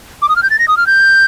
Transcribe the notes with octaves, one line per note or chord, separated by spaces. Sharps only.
D6
D#6
F6
G6
A6
A#6
D#6
F6
G6